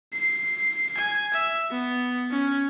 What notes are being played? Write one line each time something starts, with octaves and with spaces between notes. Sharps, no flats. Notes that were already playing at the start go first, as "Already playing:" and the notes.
C7
G#5
E5
B3
C#4